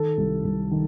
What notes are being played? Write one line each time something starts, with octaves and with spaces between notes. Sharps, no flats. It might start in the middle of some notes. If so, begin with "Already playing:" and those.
Already playing: D#3 A4
C2
C2
D#3